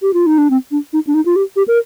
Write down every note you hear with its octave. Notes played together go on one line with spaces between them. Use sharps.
G4
F4
D#4
D4
C4
D4
D#4
D4
D#4
F4
G4
G4
A#4